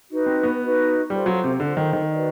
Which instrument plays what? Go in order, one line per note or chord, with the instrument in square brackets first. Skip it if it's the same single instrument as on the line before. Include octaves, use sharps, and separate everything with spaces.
[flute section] D#4 F#4 B4 D#5
[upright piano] C4
B3
[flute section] D#4 F#4 B4 D#5
[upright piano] G3 [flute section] F4 A4 C5
[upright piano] F#3
C3
[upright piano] D3 [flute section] F4 A4 C5
[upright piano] D#3
D#3
[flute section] F#4 B4 D5